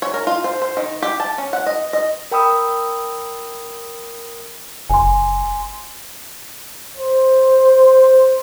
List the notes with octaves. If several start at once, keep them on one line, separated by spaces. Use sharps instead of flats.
C#5
A#4
F4
C5
C5
D#3
G4
A5
C#4
F#5
D#5
D#5
A#4 G5 B5 D#6 E6
F#1 G#5 C6
C5